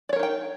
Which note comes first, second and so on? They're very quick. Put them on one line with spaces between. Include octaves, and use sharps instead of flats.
D5 C#5 A#4 D#4 G5